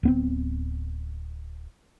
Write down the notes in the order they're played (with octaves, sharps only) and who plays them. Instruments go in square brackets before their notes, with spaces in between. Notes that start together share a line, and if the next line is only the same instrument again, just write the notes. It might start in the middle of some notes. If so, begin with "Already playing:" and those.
[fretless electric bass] D1 B3 C4